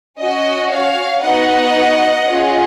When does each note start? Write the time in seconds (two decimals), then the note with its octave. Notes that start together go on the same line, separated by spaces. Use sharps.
0.19 C#4 F#4 D#5
0.70 C#5 F5
1.22 B3 D#4 F#4 D#5 F#5
2.25 C#4 F4 G#4